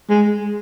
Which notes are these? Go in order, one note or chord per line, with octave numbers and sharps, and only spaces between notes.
G#3